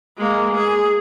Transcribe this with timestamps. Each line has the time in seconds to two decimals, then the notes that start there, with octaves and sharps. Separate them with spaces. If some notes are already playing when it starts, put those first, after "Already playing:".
0.17 G#3 A#3
0.54 G#4